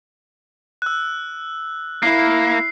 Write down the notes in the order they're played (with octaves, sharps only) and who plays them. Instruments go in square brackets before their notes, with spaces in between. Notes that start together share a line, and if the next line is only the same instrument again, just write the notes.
[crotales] E6 F#6
[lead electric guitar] A#3 [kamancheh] E4 [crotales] C7